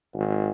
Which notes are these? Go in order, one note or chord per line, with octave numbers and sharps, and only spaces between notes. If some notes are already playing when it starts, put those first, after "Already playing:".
G#1